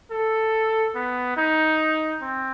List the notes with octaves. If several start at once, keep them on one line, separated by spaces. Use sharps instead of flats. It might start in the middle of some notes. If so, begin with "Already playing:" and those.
A4
B3
D#4
C4